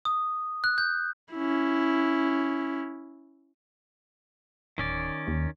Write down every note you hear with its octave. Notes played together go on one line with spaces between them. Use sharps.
D#6
F#6
G6
C#4 E4
D1 D#3 C#4 D5
D#2